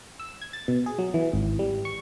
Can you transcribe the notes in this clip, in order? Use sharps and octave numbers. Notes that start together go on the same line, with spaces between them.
E6
G#6
A6
B2
G#4
F#3
E3
G#1
G3
C#6